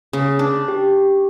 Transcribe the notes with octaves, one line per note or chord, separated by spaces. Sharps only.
C#3
D4
G4